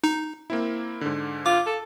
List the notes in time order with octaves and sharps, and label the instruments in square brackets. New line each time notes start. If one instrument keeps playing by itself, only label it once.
[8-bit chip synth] D#4
[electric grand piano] A#3 C4 E4
G#2 D3
[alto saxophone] F4 [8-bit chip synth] D6
[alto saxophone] A4